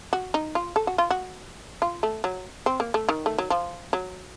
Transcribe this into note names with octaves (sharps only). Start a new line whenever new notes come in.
F#4
D#4
F4
A4
F#4
F4
F#4
F4
A3
F#3
C4
A#3
A3
D#3
A3
F#3
F3
F#3